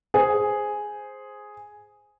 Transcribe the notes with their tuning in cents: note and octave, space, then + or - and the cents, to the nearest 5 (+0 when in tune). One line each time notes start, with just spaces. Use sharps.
G#4 +0 C5 +0